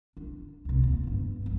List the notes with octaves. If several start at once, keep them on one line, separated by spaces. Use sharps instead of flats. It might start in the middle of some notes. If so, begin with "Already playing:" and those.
D4
C#2 C3
D#2 D#3
G2 B3
G3 C4